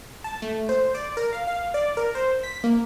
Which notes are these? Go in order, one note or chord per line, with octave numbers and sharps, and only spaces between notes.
A5
A3
C5
D5
A#4
F5
F5
D5
A#4
C5
B6
A#3